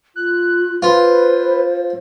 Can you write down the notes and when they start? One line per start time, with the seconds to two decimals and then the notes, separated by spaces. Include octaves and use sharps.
0.16 F4 F#6
0.82 F4 B4 C5